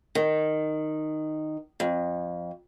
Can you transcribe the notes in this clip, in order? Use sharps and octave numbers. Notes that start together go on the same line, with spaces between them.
D#3
F2